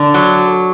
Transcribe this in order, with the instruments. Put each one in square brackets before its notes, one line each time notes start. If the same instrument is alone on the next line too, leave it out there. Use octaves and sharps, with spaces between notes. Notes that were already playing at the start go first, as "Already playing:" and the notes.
Already playing: [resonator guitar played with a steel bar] D3
F#3